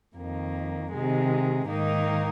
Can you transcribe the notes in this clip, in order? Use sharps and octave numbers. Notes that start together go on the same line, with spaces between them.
F2 D#3 A#3
C3 D#3 G#3
G#2 D#3 A#3 D#4 A#4